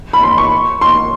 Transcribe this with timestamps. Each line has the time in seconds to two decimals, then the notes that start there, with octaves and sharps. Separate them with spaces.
0.13 B5
0.23 C6
0.38 C#6
0.81 C6